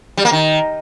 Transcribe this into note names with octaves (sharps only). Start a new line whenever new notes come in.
G3
A#3
D#3